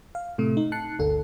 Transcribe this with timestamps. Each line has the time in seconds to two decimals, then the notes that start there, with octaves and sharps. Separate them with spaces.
0.15 F5
0.38 A2 C3 A3
0.57 D#4
0.72 A5 F#6 C7 C#7
0.99 G1 D2 A4